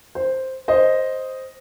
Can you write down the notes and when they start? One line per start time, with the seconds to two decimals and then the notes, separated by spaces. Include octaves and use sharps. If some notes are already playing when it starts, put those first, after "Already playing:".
0.15 C5
0.68 C5 D#5